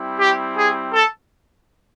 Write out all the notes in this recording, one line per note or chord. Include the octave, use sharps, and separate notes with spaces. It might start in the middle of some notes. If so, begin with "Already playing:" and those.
Already playing: G3 C4 E4
G4
G#4
A4